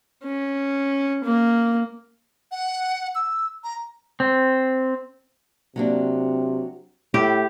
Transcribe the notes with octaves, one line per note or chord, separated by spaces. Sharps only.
C#4
A#3
F#5
E6
A#5
C4
C3 F#3 A#3 D4
A2 E4 G4